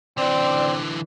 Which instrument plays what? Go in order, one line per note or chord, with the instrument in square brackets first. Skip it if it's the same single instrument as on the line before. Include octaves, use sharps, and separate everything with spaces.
[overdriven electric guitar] D3 E3 [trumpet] C4 [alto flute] D5